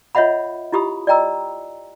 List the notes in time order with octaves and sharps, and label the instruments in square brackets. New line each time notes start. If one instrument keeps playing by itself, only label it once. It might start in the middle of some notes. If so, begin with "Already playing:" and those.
[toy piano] F4 C#5 D#5 E5 F#5 B5
E4 F4 G4 B5 D#6
D5 D#5 G5 A#5 E6